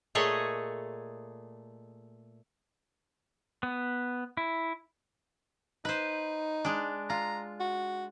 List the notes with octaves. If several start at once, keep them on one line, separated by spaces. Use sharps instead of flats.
A#2 A3 G#4 C#5 D#5
B3
E4
D#4 B4 C5
G#3 D4
F4 A#5
F#4